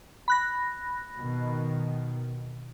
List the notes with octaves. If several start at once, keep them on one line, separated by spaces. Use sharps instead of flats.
B5 F#6 A#6
B2 D#3